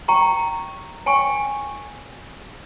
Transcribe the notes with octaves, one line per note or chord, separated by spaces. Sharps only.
G5 A#5 C#6
G5 G#5 C#6